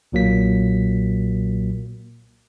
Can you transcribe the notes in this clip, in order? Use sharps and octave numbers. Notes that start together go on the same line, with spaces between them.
B1 A#2 F#3 A#3 B6